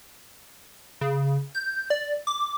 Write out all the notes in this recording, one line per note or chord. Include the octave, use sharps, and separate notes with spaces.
C#3
G6
D5
D6